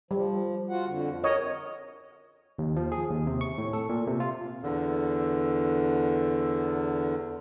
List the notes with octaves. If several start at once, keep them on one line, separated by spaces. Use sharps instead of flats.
F3 G3
F4 F#4 F#5
F2 D3
A#4 C#5 D#5
D#2
F3
G#4
D#2
C3
C#6
A2
A4
A#2
C3
F4
E2 D3